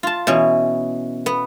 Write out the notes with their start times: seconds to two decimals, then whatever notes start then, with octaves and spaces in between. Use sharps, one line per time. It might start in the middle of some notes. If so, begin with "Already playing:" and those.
0.03 F4 A5
0.27 B2 E3 C#4
1.26 B3